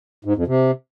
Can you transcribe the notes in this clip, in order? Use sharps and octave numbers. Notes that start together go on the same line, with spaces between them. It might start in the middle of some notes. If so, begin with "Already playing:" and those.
G#2
F2
C3